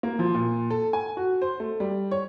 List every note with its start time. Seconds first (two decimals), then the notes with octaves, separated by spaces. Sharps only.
0.03 A#3
0.19 F3
0.35 A#2
0.70 A4
0.93 G#5
1.17 F#4
1.42 C5
1.60 A3
1.80 G3
2.11 C#5